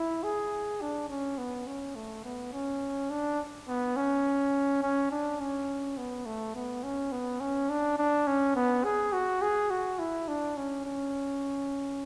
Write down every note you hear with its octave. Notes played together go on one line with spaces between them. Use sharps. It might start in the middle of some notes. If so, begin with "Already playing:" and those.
Already playing: E4
G#4
D4
C#4
B3
C#4
A3
B3
C#4
D4
B3
C#4
C#4
D4
C#4
B3
A3
B3
C#4
B3
C#4
D4
D4
C#4
B3
G#4
F#4
G#4
F#4
E4
D4
C#4
C#4